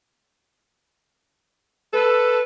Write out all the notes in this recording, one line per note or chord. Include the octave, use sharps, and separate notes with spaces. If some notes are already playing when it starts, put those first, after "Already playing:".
A4 B4